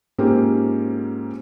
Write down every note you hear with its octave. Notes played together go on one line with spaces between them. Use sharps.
G#2 A#3 C4 C#4 F4 G4